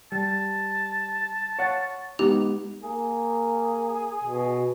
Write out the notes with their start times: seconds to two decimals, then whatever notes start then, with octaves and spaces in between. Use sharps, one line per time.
0.12 G3 A5
1.59 C#5 F5 F#5
2.19 G#3 B3 D#4 G4
2.83 A#3 G#4
4.24 B2